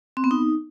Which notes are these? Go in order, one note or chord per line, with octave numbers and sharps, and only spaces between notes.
C4
B3
D#4